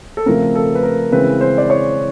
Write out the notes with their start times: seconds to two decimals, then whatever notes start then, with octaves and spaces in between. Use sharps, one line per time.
0.17 A4
0.26 C#3 F3 A3 C4 A#4
0.55 A4
0.75 B4
0.83 A#4
1.12 C#3 E3 G#3 C4 B4
1.41 C5
1.58 D5
1.70 C#5